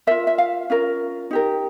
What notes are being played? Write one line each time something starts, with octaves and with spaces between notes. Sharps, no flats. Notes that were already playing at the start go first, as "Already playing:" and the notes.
F4 A#4 E5
E5
F5
C#4 F4 A#4
D#4 G4 A#4